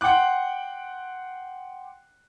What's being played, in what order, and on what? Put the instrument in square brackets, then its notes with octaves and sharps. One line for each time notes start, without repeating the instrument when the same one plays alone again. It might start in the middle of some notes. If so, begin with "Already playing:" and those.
[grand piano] F#5 G5 C6 D6 F#6